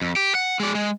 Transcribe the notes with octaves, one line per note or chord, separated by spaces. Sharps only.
F2
G4
F#5
G#3 D5
G#3